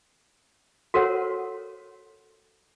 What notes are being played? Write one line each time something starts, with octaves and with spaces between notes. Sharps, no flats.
F#4 A4 A#4 C5 C#5 F#5